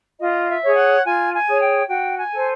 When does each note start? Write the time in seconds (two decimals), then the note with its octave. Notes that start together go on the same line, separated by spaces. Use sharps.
0.20 F4 D#5
0.48 E5
0.63 G#4 C#5
0.76 F#5
1.04 F4 G#5
1.33 G#5
1.47 G#4 C#5
1.62 G5
1.89 F#4 G5
2.18 G#5
2.31 A4 C5